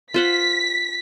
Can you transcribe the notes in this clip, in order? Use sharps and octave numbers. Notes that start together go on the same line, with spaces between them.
F4 C5 F#5 B6